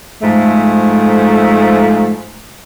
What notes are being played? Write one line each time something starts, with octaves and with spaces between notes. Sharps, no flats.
G#2 F3 A3